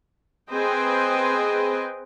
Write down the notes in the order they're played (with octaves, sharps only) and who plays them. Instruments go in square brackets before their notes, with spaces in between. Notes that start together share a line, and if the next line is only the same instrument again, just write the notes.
[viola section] C4 G#4 B4 C5 D#5 G5